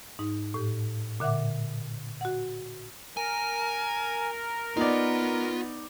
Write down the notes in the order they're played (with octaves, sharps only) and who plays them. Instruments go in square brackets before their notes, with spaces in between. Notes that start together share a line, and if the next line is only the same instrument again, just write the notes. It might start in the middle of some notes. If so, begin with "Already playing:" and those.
[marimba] G#2 D#4
A2 G4
A#2 D3 E5 F#5 D6
F#4 F#5
[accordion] A#4 [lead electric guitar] G#5
[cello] B3 [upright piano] D#4 D5 [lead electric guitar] F4